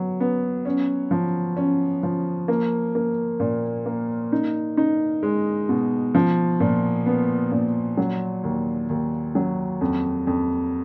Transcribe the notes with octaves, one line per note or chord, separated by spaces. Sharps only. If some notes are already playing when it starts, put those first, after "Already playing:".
Already playing: F#3 B3
B3
C#4
F3
C#4
F3
A#3
A#3
A#2
A#3
D#4
D#4
G#3
B2
F3
A#2
B3
A#2
F#3
D#2
D#2
F#3
F2
F2